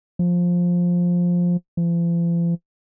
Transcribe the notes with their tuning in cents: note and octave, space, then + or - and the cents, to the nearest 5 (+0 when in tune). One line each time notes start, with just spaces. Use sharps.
F3 +10
F3 -45